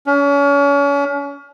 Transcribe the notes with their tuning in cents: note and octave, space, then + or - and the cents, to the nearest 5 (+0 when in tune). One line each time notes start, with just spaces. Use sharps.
C#4 +35